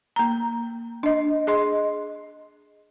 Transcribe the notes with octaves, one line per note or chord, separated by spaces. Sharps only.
A#3 A#5
D4 D#5
G#4 D#5 C6